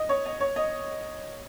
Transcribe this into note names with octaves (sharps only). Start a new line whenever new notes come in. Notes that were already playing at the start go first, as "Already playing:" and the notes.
Already playing: D#5
C#5
D#5
C#5
D#5